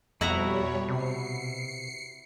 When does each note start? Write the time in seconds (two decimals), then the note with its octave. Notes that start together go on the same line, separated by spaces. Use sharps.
0.21 F2 B2 G3 E4 F#4 C#5 A#5
0.88 C3 C7 C#7